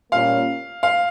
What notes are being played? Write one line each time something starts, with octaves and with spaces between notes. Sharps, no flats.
A#2 G3 A#3 C#4 F5
F5